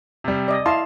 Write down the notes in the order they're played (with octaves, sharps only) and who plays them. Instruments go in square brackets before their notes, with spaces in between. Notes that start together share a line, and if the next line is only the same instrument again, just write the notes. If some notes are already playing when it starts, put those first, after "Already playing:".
[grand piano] C3 G3
[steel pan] D5 D#5
[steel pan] E4 F5 A5 [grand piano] C6